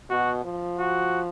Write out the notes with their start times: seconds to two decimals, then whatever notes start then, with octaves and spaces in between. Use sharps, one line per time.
0.10 B2 F#4
0.45 F3
0.79 F#4